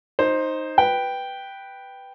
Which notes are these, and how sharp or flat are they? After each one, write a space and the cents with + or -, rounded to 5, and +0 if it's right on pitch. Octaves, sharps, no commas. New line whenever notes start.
D#4 +0 C5 +10
B4 +0 G5 +0